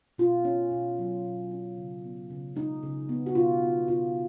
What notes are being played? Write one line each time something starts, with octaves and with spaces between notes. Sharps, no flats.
B2 F4
C#4
B2
F#3
B2
C#4
C#3
B3
C#3
G#3 D#4
C#3
B3
F#4
B2 F4
B3
B2 F4